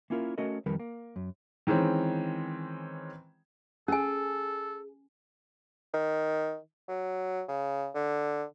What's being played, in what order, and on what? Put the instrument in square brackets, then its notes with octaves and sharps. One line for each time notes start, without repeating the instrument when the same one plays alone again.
[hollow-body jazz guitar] A#3 C#4 E4 F4 G4 A#4
A3 C#4 F#4 A4 A#4 D#5
F2 D#3 G3 A#4 B4
A#3
F#2
[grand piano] D#3 E3 G#3 C4 C#4
[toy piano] C#4 G#5 [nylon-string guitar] G#4 [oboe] A4
[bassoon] D#3
F#3
C#3
D3